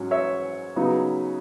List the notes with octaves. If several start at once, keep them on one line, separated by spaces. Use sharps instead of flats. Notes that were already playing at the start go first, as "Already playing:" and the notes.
Already playing: G#2 F#3 C#4
C#5 E5
C#3 F#3 B3 D#4